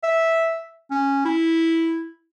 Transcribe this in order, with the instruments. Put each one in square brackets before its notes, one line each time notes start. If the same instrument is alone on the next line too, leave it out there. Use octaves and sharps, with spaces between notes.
[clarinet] E5
C#4
E4